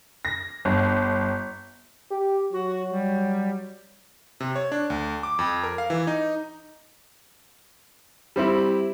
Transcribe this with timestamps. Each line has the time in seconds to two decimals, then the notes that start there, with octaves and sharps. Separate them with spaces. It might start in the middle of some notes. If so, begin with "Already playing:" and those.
0.25 A#6
0.65 G1
2.11 G4
2.52 F#3 F#4
2.91 G3
4.40 C3
4.56 C#5
4.72 D4
4.90 D2
5.23 D6
5.39 F2
5.64 A#4
5.78 F5
5.90 E3
6.07 D#4
8.36 G3 C4 E4